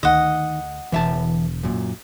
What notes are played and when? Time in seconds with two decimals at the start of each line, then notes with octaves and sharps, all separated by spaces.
0.03 D2 D3 D#3 D#5 F#5
0.92 E1 D3 E3 E5 A5
1.63 F#2 A#2